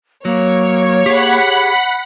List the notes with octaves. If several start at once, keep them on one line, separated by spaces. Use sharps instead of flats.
F#3 A#3 C#5
G4 G#4 F#5 B5